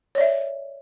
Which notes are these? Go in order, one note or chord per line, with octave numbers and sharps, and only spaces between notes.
C#5 D5 E5